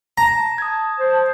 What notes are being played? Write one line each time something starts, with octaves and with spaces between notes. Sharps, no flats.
A5 A#5
D#6 G#6
C5